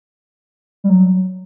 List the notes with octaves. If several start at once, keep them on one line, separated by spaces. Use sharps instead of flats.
G3
F#3